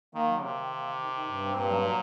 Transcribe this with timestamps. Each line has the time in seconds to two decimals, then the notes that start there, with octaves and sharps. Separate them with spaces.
0.14 D#3 A#3
0.28 F#3
0.42 C3 A#3
0.56 D#3
0.71 A#3
0.84 D#3
0.98 D#3
1.12 D#3
1.26 G2
1.40 C4
1.54 G2 A#2
1.69 F#3
1.82 F#3